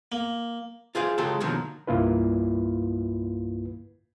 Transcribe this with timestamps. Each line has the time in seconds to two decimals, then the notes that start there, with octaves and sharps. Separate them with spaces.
0.12 A#3
0.95 F4 G#4 C5 D5 F5
1.18 C#3 F#3 G#3 F4 G4 A4
1.40 B2 D3 D#3 F3 F#3 A#3
1.87 C2 G2 A#3 E4 F4 B4